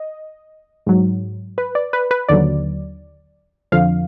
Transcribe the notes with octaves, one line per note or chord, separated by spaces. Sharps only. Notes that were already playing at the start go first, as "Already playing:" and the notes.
Already playing: D#5
G#2 F#3
B4
D5
B4
B4
D#2 D3 F#3 D5
F2 D3 F3 F5